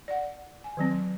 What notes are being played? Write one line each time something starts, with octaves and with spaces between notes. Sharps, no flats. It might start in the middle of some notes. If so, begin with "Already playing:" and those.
D5 F#5
G#5
D#3 F#3 C4